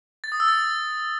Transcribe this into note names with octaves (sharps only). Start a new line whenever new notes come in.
A6
D#6
E6
A6